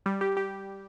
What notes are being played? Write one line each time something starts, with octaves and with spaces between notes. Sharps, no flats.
G3
G4
G4